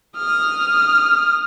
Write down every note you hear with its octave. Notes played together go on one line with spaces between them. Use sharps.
D#6 F6